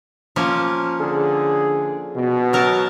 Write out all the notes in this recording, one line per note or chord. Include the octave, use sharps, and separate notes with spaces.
F3 A#3 C#4
D3 G#4
B2
F#3 A#4 A5